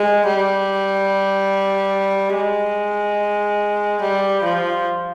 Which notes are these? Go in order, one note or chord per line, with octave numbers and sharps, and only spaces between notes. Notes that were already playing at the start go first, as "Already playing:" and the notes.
Already playing: G#3
G3
G#3
G3
F3